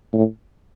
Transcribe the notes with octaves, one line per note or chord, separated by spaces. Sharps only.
A2